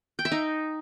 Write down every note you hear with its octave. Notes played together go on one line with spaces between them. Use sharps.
G5
E5
D#4